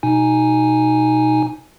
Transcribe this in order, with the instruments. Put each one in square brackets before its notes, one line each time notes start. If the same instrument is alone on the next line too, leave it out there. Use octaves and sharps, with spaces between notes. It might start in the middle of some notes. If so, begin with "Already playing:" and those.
[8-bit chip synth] B2 D#4 G#5